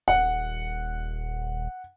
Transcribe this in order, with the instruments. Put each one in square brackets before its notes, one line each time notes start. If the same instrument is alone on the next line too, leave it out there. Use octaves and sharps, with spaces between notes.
[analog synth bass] D#1 [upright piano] F#5